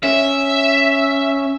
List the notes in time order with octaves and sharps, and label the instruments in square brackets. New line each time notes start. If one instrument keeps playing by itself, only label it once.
[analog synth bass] C#4 [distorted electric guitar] E5